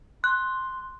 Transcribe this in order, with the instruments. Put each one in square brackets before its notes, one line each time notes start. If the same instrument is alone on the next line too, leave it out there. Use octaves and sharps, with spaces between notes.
[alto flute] C6 [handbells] F#6